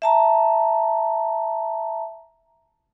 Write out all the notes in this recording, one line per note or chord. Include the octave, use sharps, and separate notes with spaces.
E5 A5 A#5